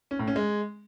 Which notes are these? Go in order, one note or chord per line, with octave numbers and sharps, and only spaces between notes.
C#4
A2
C#4
G#3